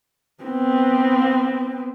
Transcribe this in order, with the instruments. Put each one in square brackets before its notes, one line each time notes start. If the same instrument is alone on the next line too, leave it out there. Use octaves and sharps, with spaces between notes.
[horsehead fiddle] B3 C4